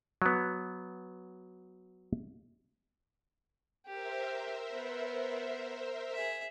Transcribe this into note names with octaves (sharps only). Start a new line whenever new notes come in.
F#3 B3
G4 A#4 C5 E5
B3 B4
G#4 E5